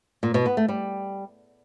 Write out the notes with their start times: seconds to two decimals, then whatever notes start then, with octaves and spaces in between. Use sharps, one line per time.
0.23 A#2
0.34 B2
0.46 B3
0.57 A3
0.68 G3